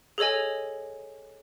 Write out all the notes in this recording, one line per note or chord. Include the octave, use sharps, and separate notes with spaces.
G#4 A4 C#5 D#5 G#5